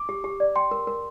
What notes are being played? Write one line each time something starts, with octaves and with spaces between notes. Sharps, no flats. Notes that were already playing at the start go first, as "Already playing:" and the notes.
Already playing: D6
G4
G4
D5
G5 C6
A#4
A#4